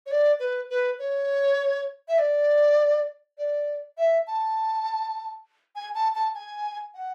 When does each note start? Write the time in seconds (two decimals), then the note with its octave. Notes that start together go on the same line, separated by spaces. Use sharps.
0.06 C#5
0.11 D5
0.40 B4
0.70 B4
0.99 C#5
2.08 E5
2.19 D5
3.38 D5
3.98 E5
4.27 A5
5.76 G#5
5.95 A5
6.15 A5
6.35 G#5
6.94 F#5